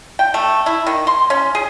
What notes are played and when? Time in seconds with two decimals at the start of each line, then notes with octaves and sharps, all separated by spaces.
0.19 G5
0.34 A3
0.66 E4
0.87 D#3
1.07 C6
1.30 C#4
1.55 G#4